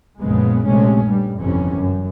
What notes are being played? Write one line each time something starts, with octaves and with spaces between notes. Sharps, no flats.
A#1 F#2 C#3 G#3 B3
A#1 C3 G#3 A3 C#4
G2 G3
G1 F2 C3 E3 C#4
F#2